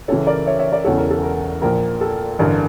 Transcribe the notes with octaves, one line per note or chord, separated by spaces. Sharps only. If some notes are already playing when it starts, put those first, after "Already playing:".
C#2 C#3 E3 A4 C#5
A#4 D5
C#5 E5
C#5 E5
A#4 D5
E1 E2 C#3 E3 A4 C#5
A#4
A4
A#4
A#1 A#2 F3 A#4
A4
A1 G2 D3 A#4